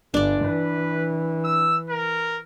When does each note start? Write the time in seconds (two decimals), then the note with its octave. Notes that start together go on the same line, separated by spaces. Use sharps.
0.14 G1 D4 D5
0.44 E3 B4
1.45 E6
1.90 A#4